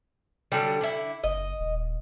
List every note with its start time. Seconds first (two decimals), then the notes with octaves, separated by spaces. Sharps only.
0.52 D3 F#3 G3
0.81 D3 E4
1.23 F#1 D#5
1.60 D#1